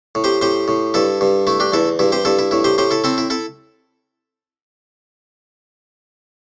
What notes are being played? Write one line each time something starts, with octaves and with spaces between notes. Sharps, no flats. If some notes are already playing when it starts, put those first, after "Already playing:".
A2
G4 C5
A2 G4 C5
A2
G2 E4 A4
G2
A3 E4
D4 G4
E2 E4 A4
G2 E4
G4 C5
G2 E4 A4
E4
A2 E4
G4 C5
A2 G4 C5
E4 A4
C4 E4 A4
E4
E4 A4